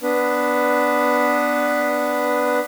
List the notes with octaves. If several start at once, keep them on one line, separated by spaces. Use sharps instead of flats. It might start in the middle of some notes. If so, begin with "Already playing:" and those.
B3 D4 B4